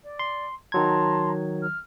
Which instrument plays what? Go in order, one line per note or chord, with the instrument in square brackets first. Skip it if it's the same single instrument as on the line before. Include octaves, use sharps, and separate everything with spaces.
[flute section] D5
[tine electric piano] C6
[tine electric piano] D#3 F#3 G#6 [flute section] A5 A#5 C6
[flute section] F6